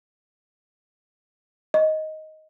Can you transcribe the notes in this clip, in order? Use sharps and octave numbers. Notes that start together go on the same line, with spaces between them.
D#5